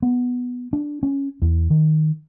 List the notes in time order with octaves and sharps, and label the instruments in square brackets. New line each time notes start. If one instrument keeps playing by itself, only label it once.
[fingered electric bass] B3
D4
C#4
E2
D#3